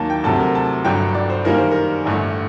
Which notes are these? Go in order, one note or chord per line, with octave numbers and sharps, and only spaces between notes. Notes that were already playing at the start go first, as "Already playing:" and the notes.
Already playing: D#2 D#3 F#3 A#3 A5
G5
D2 C3 F#3 A5
A#4
A5
G1 G2 F#3 G5
D5
C5
F#2 D#3 G3 A#3 A#4
C5
A#4
A1 G2 D3 A3